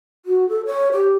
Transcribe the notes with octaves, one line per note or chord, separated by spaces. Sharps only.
F#4
A4
C#5
G4